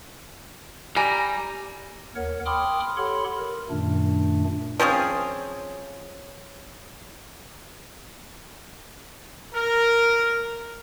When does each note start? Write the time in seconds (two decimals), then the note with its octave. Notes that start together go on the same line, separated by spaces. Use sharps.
0.96 G3 G#5 A#5
2.16 D#2 A#4 C#5 F#5
2.46 G5 B5 C6 D6 D#6 F6
2.97 G4 A4 C#5 F#5 B5 C6
3.38 A#4
3.70 F#2 A#2 D#3 A3 D4
4.79 F3 C4 C#4 G#4
9.53 A#4